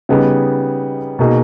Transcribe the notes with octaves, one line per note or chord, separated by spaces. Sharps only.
C#3 G3 B3 D#4 G#4
B2 A#3 D#4 G#4